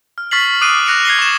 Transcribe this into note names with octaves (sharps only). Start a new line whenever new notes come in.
F6
C#6 F6 A6 B6 C7 F#7
D6 D#6 F#6 C7 D7 D#7
F#6 A#6 C#7 D7 F7
G#6 C7 G7
C#6 A6 E7